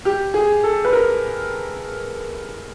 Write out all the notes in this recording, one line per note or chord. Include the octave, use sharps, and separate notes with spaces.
G4
G#4
A4
B4
A#4